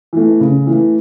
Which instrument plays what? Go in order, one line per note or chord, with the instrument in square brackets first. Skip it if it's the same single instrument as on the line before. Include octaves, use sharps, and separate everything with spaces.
[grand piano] E3 A3
C#3
E3 A3